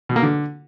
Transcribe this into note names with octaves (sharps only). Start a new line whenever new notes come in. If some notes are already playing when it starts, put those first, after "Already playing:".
B2
A#3
D3